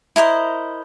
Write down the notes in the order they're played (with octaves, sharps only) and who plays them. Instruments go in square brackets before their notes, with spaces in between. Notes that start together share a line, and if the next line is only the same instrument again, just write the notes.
[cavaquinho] E4 A#4 C5 D#5